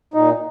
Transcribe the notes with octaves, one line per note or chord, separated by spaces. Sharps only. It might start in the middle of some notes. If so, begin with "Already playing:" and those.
A#2 D#4